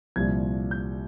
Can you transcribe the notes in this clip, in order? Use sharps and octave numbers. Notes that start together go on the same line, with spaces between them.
C2 A#2 F3 G#6
G6